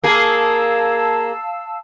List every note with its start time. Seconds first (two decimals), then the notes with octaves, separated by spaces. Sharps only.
0.04 A#3 G#4 F5 A5 E6